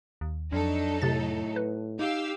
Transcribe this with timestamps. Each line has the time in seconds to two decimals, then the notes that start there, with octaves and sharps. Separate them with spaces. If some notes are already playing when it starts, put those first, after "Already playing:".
0.21 D#2
0.52 F2 F#3 D4 D#4 A4
1.02 A2 C3 A6
1.56 B4
1.99 D#4 G4 F5 E6